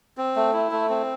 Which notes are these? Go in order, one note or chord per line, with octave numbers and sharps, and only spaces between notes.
C4
A3
E4
A3
C4